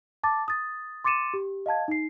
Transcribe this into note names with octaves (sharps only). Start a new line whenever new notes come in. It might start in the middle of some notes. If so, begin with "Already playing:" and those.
A5 D6 A6
D#6 A6
C6 D6 A6 C#7 D#7 E7
G4
D#5 F5 A5 G#6
D#4 C7